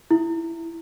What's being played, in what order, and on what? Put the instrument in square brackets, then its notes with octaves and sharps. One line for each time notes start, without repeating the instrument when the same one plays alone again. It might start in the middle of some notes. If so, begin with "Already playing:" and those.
[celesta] E4